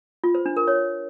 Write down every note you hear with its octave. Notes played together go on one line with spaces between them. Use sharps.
F4
C5
D4
A#4
C#5